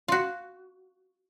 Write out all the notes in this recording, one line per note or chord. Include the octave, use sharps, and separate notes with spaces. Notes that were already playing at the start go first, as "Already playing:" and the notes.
F4 F#4